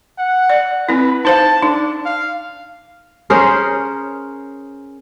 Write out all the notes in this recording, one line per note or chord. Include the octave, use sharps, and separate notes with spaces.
F#5
D5
C4 E4 B4
D#4 C5 F5 A5
D4 D#4
F5
C#4 G#4 A#4 C5